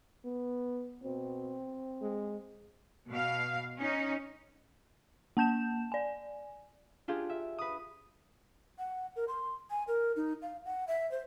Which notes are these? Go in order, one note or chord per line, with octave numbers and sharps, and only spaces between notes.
B3
B2 C4
G#3
B2 F5
C#4 D#4
A#3 A5 G6 E7
D5 G#5
D4 F4 G4 G#4
E5
B4 D#6
F#5
A#4
C6
G#5
A#4
D#4
F5
F#5
E5
C5